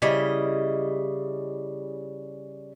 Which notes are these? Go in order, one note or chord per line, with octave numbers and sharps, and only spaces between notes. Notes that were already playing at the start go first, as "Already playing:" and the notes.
C#3 G3 E4 D#5